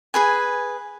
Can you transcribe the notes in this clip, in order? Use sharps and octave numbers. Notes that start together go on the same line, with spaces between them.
G#4 B4 G#5